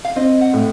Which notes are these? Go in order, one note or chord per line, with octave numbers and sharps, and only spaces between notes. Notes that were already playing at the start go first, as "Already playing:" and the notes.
F5
C4 D#5
F#5
A2